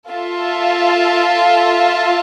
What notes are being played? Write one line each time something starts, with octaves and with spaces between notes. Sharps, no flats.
F4 A4 E5 A5